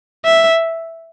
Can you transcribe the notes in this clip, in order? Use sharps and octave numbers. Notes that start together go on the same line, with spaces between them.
E5